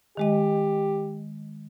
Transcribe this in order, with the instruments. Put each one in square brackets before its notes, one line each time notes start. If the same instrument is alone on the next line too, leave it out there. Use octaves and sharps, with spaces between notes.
[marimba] D#3 G#3 D#5 [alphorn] G4